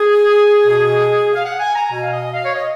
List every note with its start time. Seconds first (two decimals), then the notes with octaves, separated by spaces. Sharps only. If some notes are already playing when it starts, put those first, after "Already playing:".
Already playing: G#4
0.65 B2
1.34 F5
1.44 F#5
1.60 G#5
1.75 A#5
1.91 B2 G#5
2.02 F5
2.12 D#5
2.33 F5
2.44 C#5
2.54 D#5